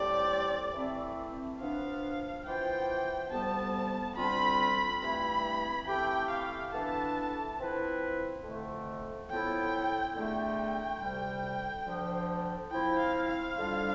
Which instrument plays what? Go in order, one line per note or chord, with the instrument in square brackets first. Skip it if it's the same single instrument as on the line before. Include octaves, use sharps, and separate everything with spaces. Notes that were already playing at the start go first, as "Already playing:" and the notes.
Already playing: [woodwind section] A2 G3 C4 G4 [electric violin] D5
[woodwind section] E3 A3 C4 E4
[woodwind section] F3 B3 D4 [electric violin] F5
[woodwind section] E3 B3 F4 C5 [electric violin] G5
[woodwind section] D2 C3 G3 B3 [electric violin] A5
[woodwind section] D2 D3 G3 C4 F4 [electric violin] B5
[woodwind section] G2 E3 A3 C4 E4 [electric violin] B5
[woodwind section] E3 A3 C4 G4 [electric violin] G5
[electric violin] F5
[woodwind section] E3 B3 D4 A4 [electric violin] A5
[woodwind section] F3 C4 E4 B4
F2 D3 A3
[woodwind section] A2 F3 B3 E4 A4 [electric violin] G5
[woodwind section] E2 D3 A3 [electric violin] G5
[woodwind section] D2 C3 G3
D2 D3 F3
[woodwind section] F3 C4 E4 [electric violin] G5
[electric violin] F5
F5
[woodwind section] F2 D3 G3 D4 F4